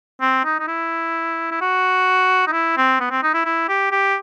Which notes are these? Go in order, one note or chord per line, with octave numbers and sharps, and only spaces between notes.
C4
D#4
D#4
E4
E4
F#4
D#4
E4
C4
B3
C4
D#4
E4
E4
G4
G4